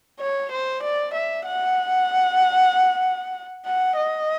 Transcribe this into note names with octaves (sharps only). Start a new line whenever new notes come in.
C#5
C5
D5
E5
F#5
F#5
D#5